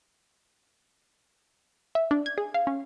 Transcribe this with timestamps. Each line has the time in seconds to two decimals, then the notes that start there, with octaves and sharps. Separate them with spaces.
1.95 E5
2.11 D4
2.26 G#6
2.38 G#4
2.54 F5
2.67 C#4